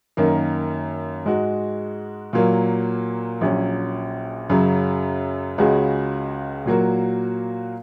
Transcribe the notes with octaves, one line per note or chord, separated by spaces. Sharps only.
F#2 D#3 A#3
G#2 G#3 F#4
A#2 F#3 A#3
A#1 A#2 F#3 C#4
F#2 C#3 F#3
C#2 C#3 G#3 C#4 F#4
A#2 F#3 A#3 F#4